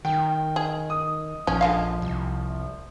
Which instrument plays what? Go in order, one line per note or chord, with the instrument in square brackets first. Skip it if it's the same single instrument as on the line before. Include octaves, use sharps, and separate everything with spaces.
[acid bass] D#3 [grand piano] G5
[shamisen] G#4
[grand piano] D#6
[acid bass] A#1 [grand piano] F3 [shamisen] C#4
[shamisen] D3 G#3 F5
[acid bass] C2